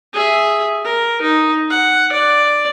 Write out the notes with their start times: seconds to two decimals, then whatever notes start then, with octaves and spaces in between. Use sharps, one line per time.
0.14 G#4 E5
0.84 A#4
1.22 D#4
1.70 F#5
2.12 D5